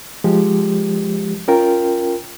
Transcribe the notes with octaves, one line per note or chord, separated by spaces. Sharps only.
F3 G#3 G4
C#4 F4 A#4 G5